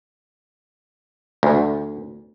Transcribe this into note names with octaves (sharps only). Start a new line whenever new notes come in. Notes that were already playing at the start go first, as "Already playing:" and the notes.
D2